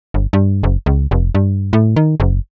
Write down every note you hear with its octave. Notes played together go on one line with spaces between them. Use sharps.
G1
G2
F#1
C#2
F1
G2
A2
D#3
F#1